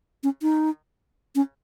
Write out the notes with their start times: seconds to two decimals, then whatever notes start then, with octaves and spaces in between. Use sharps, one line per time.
0.23 C#4
0.42 D#4
1.35 C#4